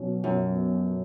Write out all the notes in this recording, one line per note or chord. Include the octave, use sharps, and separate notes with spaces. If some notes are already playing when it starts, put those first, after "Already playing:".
Already playing: B2 F#3 C#4
F#2 B2